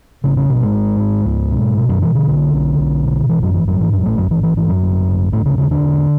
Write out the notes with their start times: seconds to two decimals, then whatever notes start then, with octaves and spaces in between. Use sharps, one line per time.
0.24 G#1 C#3 C#4
0.37 C#3 C#4
0.49 G#1 B2 B3
0.62 G#2 G#3
0.75 G#1
1.00 G#1
1.26 C#2
1.51 B2
1.77 B2
1.89 F#2 F#3
2.02 B2 E3
2.15 D3
2.27 B1
2.53 B1
2.78 B1
3.04 B2
3.29 A1 E3
3.42 F#2 F#3
3.54 G#2 E3
3.68 F#2 F#3
3.80 G#2 E3
3.92 F#2 F#3
4.05 A1 A2 A3
4.18 F#2 F#3
4.31 G#2 E3
4.43 E3
4.57 G#2 E3
4.69 F#2 F#3
4.82 G#1
5.08 G#1
5.32 D2 A2 A3
5.46 C#3 C#4
5.58 E1 C#3 C#4
5.71 D3 D4
5.84 E1